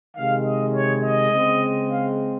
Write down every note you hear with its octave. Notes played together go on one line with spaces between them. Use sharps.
C3 D#3 G#3 F5
D#5
C#5
D#5
C#3 G#3 C4
F5